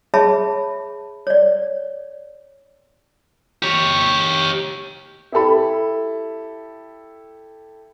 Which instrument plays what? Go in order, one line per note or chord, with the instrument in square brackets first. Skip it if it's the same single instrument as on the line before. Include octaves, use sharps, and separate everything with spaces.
[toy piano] G#4 C#5 E5 A5 B5
C#5 D5
[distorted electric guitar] G4 C#5
[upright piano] E4 G4 A4 B5